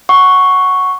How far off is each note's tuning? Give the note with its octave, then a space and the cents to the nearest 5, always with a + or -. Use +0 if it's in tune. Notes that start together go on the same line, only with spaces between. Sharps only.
F#5 +0 C#6 +0